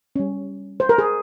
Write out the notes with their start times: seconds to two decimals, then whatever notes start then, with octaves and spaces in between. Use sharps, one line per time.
0.16 G3 C#4
0.80 C5
0.89 A#4
0.98 G#4